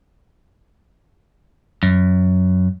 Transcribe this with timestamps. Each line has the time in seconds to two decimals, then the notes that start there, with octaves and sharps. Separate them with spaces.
1.83 F#2